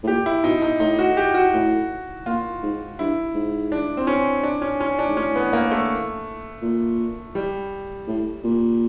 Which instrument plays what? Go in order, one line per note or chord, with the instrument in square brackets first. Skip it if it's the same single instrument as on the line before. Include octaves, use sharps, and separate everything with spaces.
[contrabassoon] A2
[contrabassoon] A#2 [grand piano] G4
[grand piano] E4
[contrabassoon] B2 [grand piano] D#4
[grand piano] D#4
[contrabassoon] A2 [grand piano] D#4
[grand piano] F#4
G4
F#4
[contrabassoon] A2
[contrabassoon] A#2 [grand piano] F4
[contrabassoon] G#2
[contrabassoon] G2 [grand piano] E4
[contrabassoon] G#2
[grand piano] D4
C4
C#4
D4
C#4
C#4
D4
[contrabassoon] G#2
[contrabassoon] A2 [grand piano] C#4
[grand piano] B3
A#3
A3
[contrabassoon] A#2
[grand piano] G3
[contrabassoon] A2
A#2